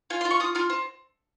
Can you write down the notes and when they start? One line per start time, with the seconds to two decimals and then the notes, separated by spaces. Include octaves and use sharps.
0.10 F4 G#5
0.21 C6
0.25 F4
0.30 C#6
0.40 F4 D#6
0.55 F4 F6
0.70 C4